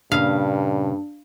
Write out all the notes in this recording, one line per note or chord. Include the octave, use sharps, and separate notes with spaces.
G2 A#2 C#3 D4 F5